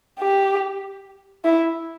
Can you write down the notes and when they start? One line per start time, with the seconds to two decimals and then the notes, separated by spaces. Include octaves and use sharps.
0.19 G4
1.45 E4